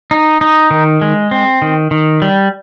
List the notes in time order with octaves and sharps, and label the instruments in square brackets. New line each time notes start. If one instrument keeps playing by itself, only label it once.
[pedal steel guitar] D#4
D#4
D#3
G#3
C4
D#3
D#3
G3